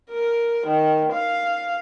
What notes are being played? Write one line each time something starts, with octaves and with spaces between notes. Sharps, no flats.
A#4
D#3
F5